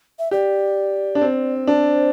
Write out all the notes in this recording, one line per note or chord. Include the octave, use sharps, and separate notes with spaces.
E5
G4 D5
D4
C4
D4 C5